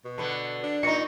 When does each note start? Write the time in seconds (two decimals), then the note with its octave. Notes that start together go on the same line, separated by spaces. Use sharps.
0.05 B2
0.18 D3 B3
0.63 D4
0.83 A#2 D#4 C#6 A#6 C#7